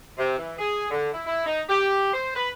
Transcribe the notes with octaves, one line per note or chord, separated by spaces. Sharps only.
C3
E3
G#4
D3
E4
E4
D#4
G4
C5
B4